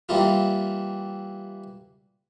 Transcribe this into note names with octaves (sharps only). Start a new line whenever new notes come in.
E3 G3 A#3 E4 F4